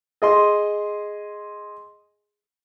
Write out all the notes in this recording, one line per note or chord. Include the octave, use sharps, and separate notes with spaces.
G#4 D#5 C6